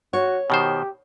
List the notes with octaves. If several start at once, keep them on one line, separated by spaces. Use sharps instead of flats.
F#4 C#5
B2 D#3 G4 C5